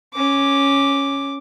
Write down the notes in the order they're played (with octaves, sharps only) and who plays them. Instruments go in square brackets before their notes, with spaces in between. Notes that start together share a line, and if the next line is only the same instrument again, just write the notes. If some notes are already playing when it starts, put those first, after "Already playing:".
[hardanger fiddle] C#4 D6